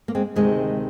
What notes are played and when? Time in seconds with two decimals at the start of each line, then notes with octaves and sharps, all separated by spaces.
0.08 A#3
0.15 G#3 C4
0.36 D2 C3 D#3 G#3